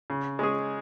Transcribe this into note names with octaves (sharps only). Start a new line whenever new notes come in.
C#3
G#3 C#4 G#4